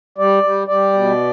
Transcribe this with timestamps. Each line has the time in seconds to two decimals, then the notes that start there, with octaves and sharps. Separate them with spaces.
0.18 G3 D5
0.43 G3
0.67 G3 D5
0.93 B2